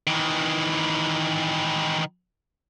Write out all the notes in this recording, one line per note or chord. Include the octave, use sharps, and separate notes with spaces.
D#3 E3